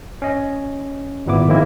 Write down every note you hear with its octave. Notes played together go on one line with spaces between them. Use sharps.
C#4 D#5
G#1 A#2 B3 E4 D6
D#3 F3 G#3 A#3 C4 E4